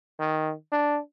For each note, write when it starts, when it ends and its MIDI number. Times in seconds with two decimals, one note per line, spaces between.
0.19 0.53 51
0.72 0.99 62